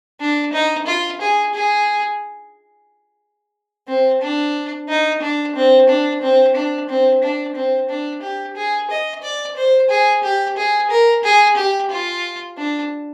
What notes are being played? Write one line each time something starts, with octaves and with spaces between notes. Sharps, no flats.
D4
D#4
F4
G#4
G#4
C4
D4
D#4
D4
C4
D4
C4
D4
C4
D4
C4
D4
G4
G#4
D#5
D5
C5
G#4
G4
G#4
A#4
G#4
G4
F4
D4